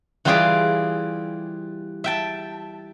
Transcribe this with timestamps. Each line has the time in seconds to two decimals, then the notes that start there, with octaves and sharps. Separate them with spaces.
0.25 E3 G3 F4 G4 G#4 D5
2.04 E5 G5 A5